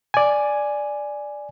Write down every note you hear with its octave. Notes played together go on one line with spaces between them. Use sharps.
D5 G#5